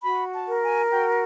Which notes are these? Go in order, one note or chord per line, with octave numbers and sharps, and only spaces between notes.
F#4 B5
A5
A#4
G#5
F#4 G5